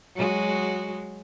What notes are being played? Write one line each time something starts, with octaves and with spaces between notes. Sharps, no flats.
F#3 G#3 F#4